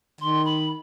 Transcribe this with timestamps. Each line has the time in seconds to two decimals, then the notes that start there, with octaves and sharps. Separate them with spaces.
0.21 D#3 C6
0.45 B5